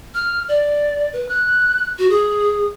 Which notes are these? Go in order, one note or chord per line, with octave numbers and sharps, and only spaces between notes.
F6
D5
B4
F#6
F#4
G#4